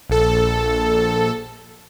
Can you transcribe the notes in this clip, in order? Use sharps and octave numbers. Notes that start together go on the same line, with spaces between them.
A#1 A4